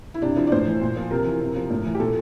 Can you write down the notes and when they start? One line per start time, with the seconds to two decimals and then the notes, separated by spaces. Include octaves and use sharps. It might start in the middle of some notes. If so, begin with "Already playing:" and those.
0.14 E4
0.22 C3 D4
0.36 F3 E4
0.47 D5
0.52 A2 C5
0.66 E3
0.81 A#2
0.96 F3
1.11 C3 A#4
1.26 E3
1.40 C3
1.56 F3
1.70 A2
1.85 E3
1.95 G4
2.00 A#2 A4